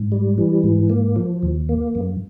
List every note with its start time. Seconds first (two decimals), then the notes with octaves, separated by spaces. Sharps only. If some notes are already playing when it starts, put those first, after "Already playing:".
Already playing: G#2
0.12 G3
0.38 E3
0.64 G#2
0.90 A#3
1.16 F3
1.43 D#2
1.69 A#3
1.95 F#2